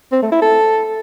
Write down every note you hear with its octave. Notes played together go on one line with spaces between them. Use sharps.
C4
A3
E4
A4